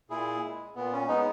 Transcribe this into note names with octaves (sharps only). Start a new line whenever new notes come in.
A#2 E4 G#4
G#3
A#2 B3
C#4
G#3 B3 D#4